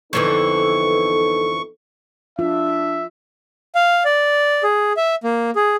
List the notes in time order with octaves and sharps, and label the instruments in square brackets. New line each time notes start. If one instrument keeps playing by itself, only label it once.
[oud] F2 D3 E3 [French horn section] B3 D#4 A4 [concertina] C#6
[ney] D4 [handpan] F4 [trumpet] E5
[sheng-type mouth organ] F5
D5
G#4
E5
A#3
G#4